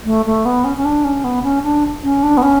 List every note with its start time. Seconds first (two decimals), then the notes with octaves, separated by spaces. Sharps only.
0.05 A3
0.26 A3
0.45 B3
0.65 C#4
0.77 C#4
0.85 D4
1.04 C#4
1.24 B3
1.43 C#4
1.63 D4
2.03 C#4
2.23 D4
2.37 B3
2.43 C#4